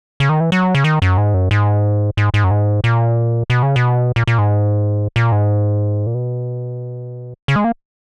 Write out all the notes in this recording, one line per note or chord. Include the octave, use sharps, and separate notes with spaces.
C#3
D#3
E3
F#3
C#3
D#3
F#2
G#2
F#2
G#2
G#2
G#2
F#2
G#2
A#2
B2
C#3
B2
A#2
A#2
G#2
A#2
G#2
A#2
B2
C#3
G#3
A#3